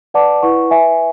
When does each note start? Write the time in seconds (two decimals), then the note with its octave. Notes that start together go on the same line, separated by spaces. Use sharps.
0.14 B4 D5 F#5 A5 D6
0.43 E4 B4 F#5 C#6
0.71 B4 E5 G#5